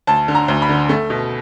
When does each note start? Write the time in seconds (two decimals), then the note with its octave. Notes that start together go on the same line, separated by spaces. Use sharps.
0.07 D2 A5
0.28 D3
0.35 A#5
0.48 D2
0.62 B5
0.69 D3
0.89 A3
1.10 B2